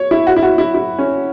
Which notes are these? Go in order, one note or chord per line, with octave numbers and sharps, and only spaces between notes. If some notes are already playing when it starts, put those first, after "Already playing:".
Already playing: C#5
E4
F#4
E4
F#4
E4
E4
C#4